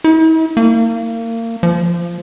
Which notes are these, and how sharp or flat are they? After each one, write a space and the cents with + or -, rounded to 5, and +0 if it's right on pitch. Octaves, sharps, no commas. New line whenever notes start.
E4 -45
A#3 -30
F3 -15